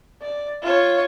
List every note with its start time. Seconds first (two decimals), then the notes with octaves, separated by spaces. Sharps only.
0.22 D5
0.62 F4 C#5